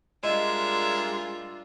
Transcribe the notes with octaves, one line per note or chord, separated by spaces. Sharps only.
G3 G#3 D4 F4 A#4 D#5 E5